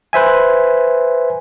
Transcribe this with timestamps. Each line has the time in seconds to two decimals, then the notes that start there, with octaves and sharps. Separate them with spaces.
0.13 B4 C5 E5 G#5